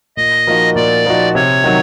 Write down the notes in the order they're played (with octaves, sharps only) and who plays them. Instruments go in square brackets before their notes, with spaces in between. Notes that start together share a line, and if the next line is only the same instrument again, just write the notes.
[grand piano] A#2 [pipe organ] D#5
[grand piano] F3 A#3 D#4 F#4
[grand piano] A#2 [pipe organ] D5
[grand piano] F3 A#3 D#4 F#4
[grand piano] C3 [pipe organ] C#5
[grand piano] D#3 F#3